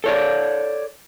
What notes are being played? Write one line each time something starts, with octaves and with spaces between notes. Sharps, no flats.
A4 C#5 D5